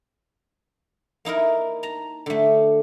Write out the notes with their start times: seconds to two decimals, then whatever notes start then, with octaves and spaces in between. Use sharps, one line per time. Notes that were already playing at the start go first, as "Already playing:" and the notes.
1.25 A#3 D#4 E4 A#4
1.83 A5 A#5
2.26 D3 A3